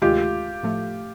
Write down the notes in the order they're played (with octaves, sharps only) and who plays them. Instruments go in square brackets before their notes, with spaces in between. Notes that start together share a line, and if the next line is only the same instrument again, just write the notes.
[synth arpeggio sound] D2 C3 D#3 G#3 [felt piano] F4 G4
[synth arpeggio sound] A2 F3 A3